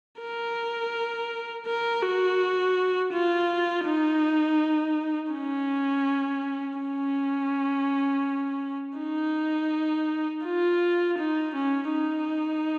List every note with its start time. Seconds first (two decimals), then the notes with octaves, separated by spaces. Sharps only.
0.21 A#4
1.67 A#4
2.03 F#4
3.13 F4
3.86 D#4
5.33 C#4
6.79 C#4
8.98 D#4
10.45 F4
11.18 D#4
11.55 C#4
11.91 D#4